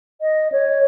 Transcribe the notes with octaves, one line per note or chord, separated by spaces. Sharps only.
D#5
C#5